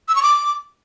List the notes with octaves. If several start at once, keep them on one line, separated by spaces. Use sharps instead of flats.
E6
C#6
D6